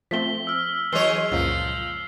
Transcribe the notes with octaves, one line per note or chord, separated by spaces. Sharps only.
F3 A3 C4 B6 G7
E6 F6
E3 F#3 G#3 G#4 C#5 C7 G7
C#2 F#2 A#2 F3